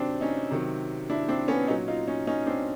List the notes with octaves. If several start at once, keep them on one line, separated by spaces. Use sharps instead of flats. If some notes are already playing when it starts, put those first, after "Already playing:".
Already playing: C3 D#3 F#3 C4 D4
C#4 D#4
C3 D#3 F#3
D4 E4
C4 D4
B3 C#4
A#2 F#3 C#4 D#4
D#4 F4
C#4 D#4
C#4 D#4
C4 D4